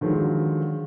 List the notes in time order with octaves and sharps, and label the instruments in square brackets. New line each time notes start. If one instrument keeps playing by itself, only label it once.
[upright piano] D3 D#3 F3 F#3 G#3